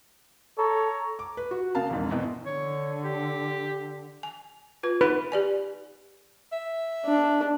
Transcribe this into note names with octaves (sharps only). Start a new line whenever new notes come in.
A4 C#5 A#5
D6
B4
F#4
C#3 A#3 F5 A5
E1 F2 G#2
E2 B2 E3 C4
D3 C#5
G4
G#5
F4 B4
D#4 B4
G4 D5 G#5
E5
D4